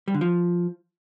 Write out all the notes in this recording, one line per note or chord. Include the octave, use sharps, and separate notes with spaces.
G3
D3
F3